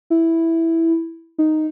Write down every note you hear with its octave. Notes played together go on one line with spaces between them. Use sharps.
E4
D#4